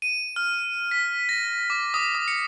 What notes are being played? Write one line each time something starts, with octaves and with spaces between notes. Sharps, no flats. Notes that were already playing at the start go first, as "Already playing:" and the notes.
D#7
F6
B6
A#6
D6
D#6
D#6
C#7